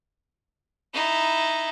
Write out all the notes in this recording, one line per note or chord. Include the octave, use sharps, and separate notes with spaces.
D#4 E4